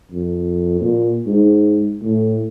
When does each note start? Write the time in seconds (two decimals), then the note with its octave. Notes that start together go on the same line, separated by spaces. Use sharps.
0.11 F2
0.81 A#2
1.27 G#2
2.03 A2